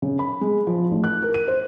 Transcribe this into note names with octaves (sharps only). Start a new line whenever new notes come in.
C#3
B5
G#3
F3
A1
F#6
A#4
D#7
C5